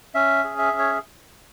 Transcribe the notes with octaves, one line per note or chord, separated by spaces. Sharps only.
C#4 E5
G#4
E5
C#4
C#5